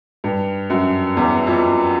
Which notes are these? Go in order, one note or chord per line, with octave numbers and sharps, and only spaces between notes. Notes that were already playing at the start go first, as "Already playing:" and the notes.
G2
F#2
E2
F2